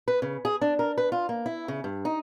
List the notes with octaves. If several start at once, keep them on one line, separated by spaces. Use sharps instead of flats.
B4
C#3
G#4
D4
A#4
B4
F4
A#3
E4
C#3
G2
D#4